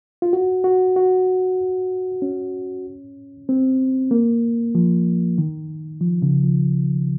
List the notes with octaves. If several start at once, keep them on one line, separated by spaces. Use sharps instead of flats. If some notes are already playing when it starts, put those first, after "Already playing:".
F4
F#4
F#4
F#4
C#4
C4
A#3
F3
D#3
F3
C#3
F3